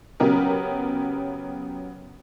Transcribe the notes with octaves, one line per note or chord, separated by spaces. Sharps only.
C#3 F#3 B3 G4 A#4